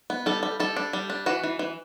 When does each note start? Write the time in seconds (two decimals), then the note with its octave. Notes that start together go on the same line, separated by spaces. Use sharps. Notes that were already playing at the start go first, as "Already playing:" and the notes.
0.10 B3
0.26 G3 A4
0.43 G3
0.60 G3 A4
0.76 D4
0.93 G3
1.10 D4
1.26 E3 F#4
1.44 E3
1.59 E3